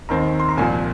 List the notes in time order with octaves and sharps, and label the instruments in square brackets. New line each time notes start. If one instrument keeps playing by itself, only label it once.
[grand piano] D#2 D#3 C4 A#5
C6
A#5
C2 A#2 F3 G#5